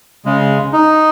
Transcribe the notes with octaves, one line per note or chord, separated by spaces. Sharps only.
C#3 G#3
D#4